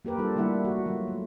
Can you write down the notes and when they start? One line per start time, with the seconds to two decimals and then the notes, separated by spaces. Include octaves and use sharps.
0.05 A#3 G4 A#4 B4
0.18 G3 D4 F4 A4
0.36 G3 A3 A#3 E4 E5 F#5
0.65 G#3 F#4
0.86 F#3 F4
1.07 A3